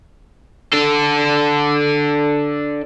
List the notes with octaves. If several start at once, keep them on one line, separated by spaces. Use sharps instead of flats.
D4 A4